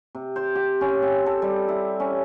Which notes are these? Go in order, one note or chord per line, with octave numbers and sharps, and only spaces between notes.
C3
C5
G4
C#4
C4
A4
G3
E4
C#4